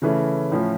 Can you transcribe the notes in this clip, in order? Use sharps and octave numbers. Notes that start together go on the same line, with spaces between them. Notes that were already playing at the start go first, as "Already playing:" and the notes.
C#3 E3 A3 C#4
A2 F3 C#4